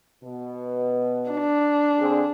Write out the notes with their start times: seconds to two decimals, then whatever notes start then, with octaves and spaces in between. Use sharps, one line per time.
0.24 B2
1.31 D4
2.00 D3 C4 G#4